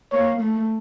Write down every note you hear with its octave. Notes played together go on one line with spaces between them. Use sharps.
A#3 C#5
A3